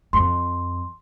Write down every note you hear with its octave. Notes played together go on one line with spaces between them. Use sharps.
F2 C6